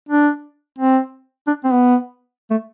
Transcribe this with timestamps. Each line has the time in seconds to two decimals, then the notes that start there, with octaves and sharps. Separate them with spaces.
0.09 D4
0.78 C4
1.47 D4
1.64 C4
1.72 B3
2.50 A3